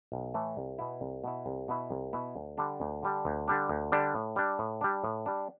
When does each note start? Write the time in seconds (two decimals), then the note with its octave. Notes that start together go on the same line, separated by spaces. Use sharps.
0.12 B1
0.34 A2 E3 A3
0.57 C2
0.79 B2 B3 E4
1.01 C2
1.24 B2 B3 E4
1.46 C2
1.68 B2 B3 E4
1.91 C2
2.13 B2 B3 E4
2.35 D2
2.58 D3 G3 D4
2.80 D2
3.03 D3 G3 D4
3.25 D2
3.48 D3 G3 D4
3.69 D2
3.92 D3 G3 D4
4.15 A2
4.36 G3 D4
4.59 A2
4.81 G3 D4
5.04 A2
5.26 G3 D4